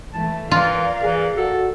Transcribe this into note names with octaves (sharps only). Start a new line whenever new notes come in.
E3 A3 A5
E3 F4 A#4 D5 F5
E3 G#4
F#4 A4